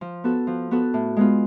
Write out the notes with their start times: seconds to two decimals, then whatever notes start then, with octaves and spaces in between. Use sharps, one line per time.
0.01 F3
0.24 B3 F#4 A4
0.47 F3
0.71 B3 F#4 A4
0.94 A2
1.16 G#3 B3 F4